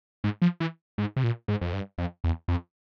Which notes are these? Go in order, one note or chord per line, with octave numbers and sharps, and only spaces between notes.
G#2
F3
E3
G#2
C3
A#2
G#2
F2
G2
F2
E2
F2